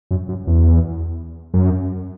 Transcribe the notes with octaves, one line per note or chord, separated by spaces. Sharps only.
F#2
F#2
E2
F#2